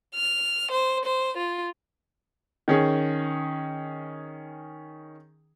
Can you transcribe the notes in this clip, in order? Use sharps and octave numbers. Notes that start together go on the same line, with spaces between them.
F6
C5
C5
F4
D#3 C#4 G#4